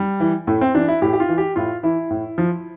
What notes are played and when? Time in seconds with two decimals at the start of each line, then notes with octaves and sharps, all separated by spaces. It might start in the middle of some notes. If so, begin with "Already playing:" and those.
Already playing: G3
0.20 E3
0.47 A2 A3
0.61 C4
0.75 E3 D4
0.88 E4
1.02 A2 G4
1.13 G4
1.20 F4
1.29 E3
1.38 G4
1.56 A2 F4
1.83 E3 E4
2.10 A2
2.38 F3